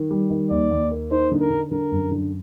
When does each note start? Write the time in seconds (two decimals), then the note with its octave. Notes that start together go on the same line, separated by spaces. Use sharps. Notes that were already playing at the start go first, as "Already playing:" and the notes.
Already playing: D#3
0.11 G3
0.31 D#3
0.50 D#2 D5
0.71 D#2
0.91 A#3
1.11 D#4 C5
1.32 D3
1.40 A#4
1.50 D3
1.71 D3 A#4
1.91 F#2
2.11 D3